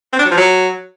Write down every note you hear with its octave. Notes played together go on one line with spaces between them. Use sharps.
C4
D4
F#3
F3
F#3